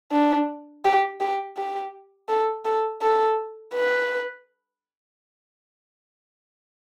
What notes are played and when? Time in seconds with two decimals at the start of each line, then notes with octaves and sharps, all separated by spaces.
0.12 D4
0.85 G4
1.21 G4
1.57 G4
2.29 A4
2.65 A4
3.02 A4
3.74 B4